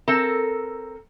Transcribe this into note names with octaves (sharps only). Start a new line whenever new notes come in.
C4 A4 A#4